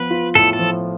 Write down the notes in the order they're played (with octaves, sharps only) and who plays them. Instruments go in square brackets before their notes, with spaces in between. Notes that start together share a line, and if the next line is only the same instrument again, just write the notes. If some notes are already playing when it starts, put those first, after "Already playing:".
Already playing: [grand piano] F3 B3 [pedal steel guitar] B4
[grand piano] F4
[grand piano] A2 [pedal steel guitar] A4
[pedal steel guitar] A4
[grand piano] F3